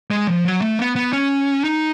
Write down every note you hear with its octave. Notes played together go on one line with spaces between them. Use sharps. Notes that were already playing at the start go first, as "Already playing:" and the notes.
G#3
F3
F#3
A3
B3
B3
C#4
D#4